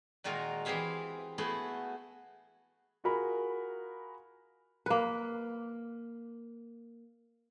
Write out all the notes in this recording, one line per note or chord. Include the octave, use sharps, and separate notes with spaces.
A#2 D#3 G#3 F4 F#4 A#4
E3 C4 G4 G#4 E5 F5
A3 B3 E4 F#4 G#4
F4 F#4 G#4 A#4 B5
A#3 B4